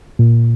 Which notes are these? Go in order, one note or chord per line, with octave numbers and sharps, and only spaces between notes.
A#2